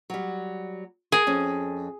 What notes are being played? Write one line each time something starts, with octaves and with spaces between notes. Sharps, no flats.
F#3 G3
G#4 A#4
F2 C#4